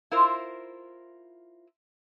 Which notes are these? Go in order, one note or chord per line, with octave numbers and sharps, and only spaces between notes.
E4 F4 A#4 C5